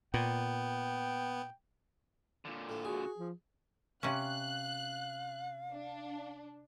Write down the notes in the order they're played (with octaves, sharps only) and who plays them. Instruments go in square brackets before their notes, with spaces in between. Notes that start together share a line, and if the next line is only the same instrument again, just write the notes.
[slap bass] A#2 [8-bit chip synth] B3 [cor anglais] G5
[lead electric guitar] A#2 D3
[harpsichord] A2 A3
[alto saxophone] F#4 [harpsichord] G#4
[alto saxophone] F3
[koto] C3 C#4 [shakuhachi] F5 [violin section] F#6
[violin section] D4